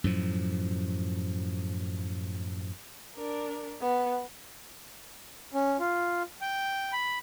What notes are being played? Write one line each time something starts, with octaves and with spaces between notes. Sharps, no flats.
F#2 A2 F3
D4 A#4
B3
C#4
F4
G5
B5